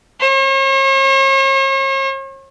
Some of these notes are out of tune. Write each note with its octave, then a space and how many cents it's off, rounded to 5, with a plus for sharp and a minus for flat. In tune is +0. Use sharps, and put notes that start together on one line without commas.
C#5 -45